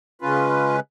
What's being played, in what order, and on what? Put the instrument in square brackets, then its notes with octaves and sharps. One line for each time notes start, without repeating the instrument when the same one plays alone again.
[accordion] C#3 G#3 C#4 F4 B4